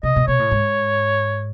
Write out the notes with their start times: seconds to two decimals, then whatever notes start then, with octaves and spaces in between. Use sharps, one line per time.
0.03 C3 D#5
0.16 B2
0.28 B2 C#5
0.39 A2
0.51 G#2